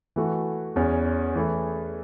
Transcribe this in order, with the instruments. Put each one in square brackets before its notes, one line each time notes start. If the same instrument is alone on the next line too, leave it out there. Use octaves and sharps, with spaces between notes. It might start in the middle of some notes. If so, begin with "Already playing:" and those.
[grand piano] E3 A3 F#4
E2 E3 C#4
E3 A3 E4